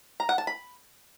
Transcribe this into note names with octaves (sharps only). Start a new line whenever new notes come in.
A#5
F#5
A5
B5